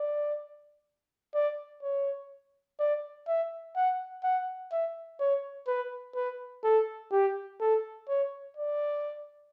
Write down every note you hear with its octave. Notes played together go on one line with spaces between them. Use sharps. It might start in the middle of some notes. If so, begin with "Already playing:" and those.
Already playing: D5
D5
C#5
D5
E5
F#5
F#5
E5
C#5
B4
B4
A4
G4
A4
C#5
D5